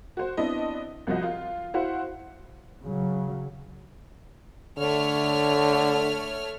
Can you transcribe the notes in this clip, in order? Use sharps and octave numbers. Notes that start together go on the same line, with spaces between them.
F#4 C5
B3 C4 D4 E4 D#5
C2 F3 F#4 D#5
F4
E4 F#4 C5 F5 F#5
C#3 F#3
D3 A3 C#5 F6